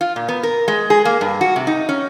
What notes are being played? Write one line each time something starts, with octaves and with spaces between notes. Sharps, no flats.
F4
A#2
B3
A#4
G#3
G#4
A#3
G2
F#4
C3
D#4
C#4